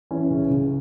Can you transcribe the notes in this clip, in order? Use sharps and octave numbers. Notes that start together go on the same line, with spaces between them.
E3 C#4
C#2
C#2